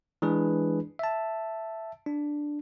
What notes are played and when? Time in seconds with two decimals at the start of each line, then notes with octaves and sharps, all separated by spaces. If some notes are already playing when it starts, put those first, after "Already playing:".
0.22 E3 G#3 D4 G#4 B4
0.99 E5 A5
2.06 D4